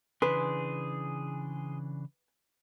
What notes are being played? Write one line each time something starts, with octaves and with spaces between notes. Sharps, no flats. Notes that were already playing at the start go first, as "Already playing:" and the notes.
C#3 E3 D4 G#4 B4 C6